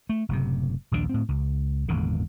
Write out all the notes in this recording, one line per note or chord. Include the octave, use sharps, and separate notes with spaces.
A3
F#1 A2 C3
A#1 D#2 D3 D4
A2 C4
C#2
G#1 E2 A#2 D3